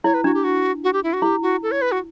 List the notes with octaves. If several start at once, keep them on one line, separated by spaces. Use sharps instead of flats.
E4 C#5
B4
D4 F#4
G4
F#4
F#4
G4
E4
F#4
E4 G4
F#4
A4
C#5
B4
F#4